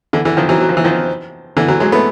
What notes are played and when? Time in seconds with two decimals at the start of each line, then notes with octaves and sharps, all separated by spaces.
0.13 D3 E3
0.25 D3 E3
0.37 D#3 F3
0.49 E3 F#3
0.61 F#3
0.69 F3
0.77 E3
0.84 D#3 F3
1.57 D3 E3
1.68 E3 F#3
1.80 F#3 G#3
1.92 A3 B3